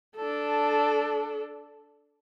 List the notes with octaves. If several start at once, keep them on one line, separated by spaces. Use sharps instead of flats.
D4 A4